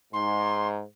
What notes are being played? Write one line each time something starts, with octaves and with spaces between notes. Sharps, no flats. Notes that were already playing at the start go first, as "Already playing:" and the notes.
G#2 C6